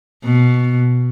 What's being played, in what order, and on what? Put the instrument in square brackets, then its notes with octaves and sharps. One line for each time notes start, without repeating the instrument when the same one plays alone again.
[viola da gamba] B2